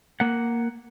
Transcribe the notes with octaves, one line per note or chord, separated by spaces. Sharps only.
A#3 F#5